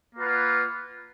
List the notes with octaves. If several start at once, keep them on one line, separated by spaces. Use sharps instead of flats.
A#3 F4 B4 F#5